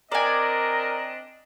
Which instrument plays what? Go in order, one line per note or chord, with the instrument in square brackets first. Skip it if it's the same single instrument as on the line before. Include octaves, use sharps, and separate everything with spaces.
[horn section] C4 D4 D#5 [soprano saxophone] A#4 [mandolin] D5 G#5